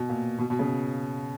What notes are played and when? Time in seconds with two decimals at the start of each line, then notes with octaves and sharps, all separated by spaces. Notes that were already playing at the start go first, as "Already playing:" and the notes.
Already playing: B2
0.09 A#2
0.39 B2
0.50 B2
0.59 C#3